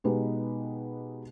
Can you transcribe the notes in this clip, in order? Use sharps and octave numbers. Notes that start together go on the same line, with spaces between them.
B2 G#3 D#4 G4 B4